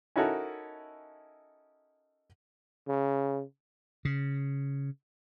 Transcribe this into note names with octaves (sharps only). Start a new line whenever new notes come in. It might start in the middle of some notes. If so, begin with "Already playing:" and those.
C#4 D#4 E4 F#4 A4 A#4
C#3
C#3